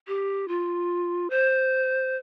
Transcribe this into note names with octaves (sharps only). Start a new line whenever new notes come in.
G4
F4
C5